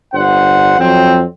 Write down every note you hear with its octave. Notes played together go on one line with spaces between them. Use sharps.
G1 D4 C5 F#5
F2 F#3 C4